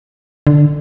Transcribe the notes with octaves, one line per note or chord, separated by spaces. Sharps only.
D3